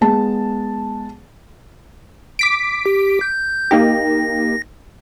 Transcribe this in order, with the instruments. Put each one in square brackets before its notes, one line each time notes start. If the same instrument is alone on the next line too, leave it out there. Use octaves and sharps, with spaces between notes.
[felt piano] G#3 B3 A5
[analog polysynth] D6 B6 D7
[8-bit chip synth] G4
G6
[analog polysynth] A#3 D#4 G4 [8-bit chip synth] A#6